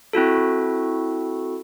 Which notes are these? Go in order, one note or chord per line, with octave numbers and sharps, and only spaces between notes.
C4 E4 F#4 A4